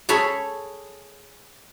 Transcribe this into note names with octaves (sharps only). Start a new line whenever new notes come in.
G#4 A4 C#5 B5